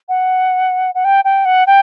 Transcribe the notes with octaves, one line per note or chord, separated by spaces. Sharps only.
F#5
F#5
G5
G5
F#5
G5